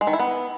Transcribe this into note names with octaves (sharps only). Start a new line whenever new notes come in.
G#3
D#3
E4
B3